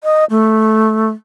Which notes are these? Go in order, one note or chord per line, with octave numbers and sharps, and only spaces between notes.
D#5
A3